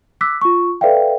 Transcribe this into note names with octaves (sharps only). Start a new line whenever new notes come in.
D6 E6 F#6 B6
F4 C#6
A4 B4 D5 E5 F5 G5